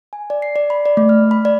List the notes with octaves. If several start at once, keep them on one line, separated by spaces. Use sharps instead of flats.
G#5
D5
C7
D5
B5
D5
A3
F6
B5
D5